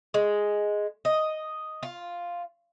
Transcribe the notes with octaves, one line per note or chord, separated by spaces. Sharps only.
G#3
D#5
F4